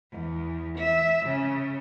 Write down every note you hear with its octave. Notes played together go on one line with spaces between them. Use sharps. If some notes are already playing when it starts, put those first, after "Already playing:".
E2
E5
C#3